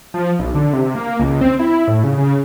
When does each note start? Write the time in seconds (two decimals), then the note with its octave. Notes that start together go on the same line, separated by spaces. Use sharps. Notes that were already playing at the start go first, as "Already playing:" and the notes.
0.14 F3
0.39 B1
0.55 D3
0.73 C3
0.95 A#3
1.20 C#2
1.41 C4
1.59 E4
1.88 A2
2.04 C#3
2.17 C#3